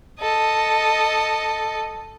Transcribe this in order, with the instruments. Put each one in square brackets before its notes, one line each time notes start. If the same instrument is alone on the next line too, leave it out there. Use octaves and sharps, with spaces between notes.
[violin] A4 D#5